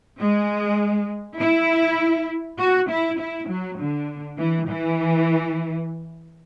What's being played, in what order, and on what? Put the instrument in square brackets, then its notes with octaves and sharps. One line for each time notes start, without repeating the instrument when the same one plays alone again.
[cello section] G#3
E4
F#4
E4
E4
F#3
D3
E3
E3